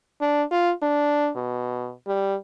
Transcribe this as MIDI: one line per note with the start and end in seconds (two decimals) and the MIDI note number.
0.21 0.43 62
0.51 0.72 65
0.82 1.29 62
1.36 1.91 47
2.07 2.35 55